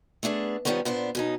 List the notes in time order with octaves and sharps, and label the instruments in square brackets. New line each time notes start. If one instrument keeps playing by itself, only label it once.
[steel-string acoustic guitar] A3 B3 D4 G#4
D#3 F3 G3 A3 B3 C#4
A#2 B3 D4 C5
B2 C#4 D#4